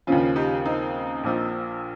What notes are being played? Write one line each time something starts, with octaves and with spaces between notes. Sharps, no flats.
D#2 C#3 F3 C#4 F4
D#4 G4
C4 D#4
A#1 A#2 F3